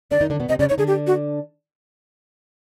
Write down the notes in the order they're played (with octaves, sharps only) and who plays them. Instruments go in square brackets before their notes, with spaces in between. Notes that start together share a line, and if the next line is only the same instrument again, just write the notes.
[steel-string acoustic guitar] D3 D4 [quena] D5
[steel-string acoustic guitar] D#3 D#4
D3 D4
B2 B3
[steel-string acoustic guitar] C3 C4 [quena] D#5
[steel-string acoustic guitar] C#3 C#4 [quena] D5
[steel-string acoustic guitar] D#4 [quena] C#5
[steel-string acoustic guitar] D3 D4 [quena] G#4
[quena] G4
F#4